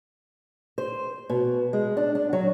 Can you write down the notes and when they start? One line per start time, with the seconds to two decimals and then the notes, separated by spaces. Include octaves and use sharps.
0.78 C5
1.30 B2
1.73 G#3
1.97 D4
2.15 D4
2.33 F#3